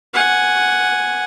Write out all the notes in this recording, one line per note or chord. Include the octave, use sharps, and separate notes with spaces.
F#5 G#5